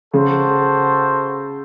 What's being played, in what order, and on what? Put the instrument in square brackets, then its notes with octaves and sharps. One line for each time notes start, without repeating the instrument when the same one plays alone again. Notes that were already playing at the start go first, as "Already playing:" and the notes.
[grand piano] C#3 [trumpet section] F#4 A4 C5